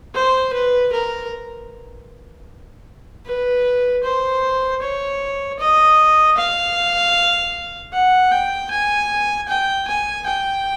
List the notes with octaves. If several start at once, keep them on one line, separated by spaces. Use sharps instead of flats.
C5
B4
A#4
B4
C5
C#5
D#5
F5
F#5
G5
G#5
G5
G#5
G5